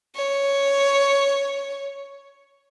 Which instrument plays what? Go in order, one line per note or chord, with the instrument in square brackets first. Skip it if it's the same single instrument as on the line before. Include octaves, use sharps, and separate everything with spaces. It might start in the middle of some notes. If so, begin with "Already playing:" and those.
[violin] C#5